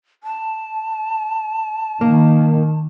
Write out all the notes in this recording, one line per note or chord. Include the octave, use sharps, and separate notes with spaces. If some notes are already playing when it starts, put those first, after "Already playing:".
A5
D#3 A#3